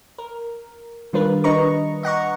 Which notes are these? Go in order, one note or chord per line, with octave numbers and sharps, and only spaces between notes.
A#4
D#3 G3 D4 F4 A#4 B4
D4 B4 D#5 A#5 C#6
D#5 F#5 A#5 C#6